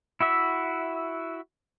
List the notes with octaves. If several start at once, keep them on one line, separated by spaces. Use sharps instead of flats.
E4 F#4 E5